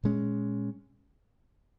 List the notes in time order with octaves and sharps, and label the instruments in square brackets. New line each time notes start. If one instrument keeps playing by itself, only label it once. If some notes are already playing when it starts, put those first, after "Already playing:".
[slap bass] A#2 G#3 C#4